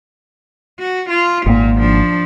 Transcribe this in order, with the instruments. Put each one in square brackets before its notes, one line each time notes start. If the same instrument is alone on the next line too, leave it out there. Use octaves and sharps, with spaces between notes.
[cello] F#4
F4
[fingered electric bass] G#1 A#3 [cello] A#2
[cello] F3 D4